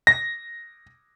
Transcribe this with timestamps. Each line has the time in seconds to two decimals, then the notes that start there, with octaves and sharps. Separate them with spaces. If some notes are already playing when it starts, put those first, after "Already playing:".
0.07 A#6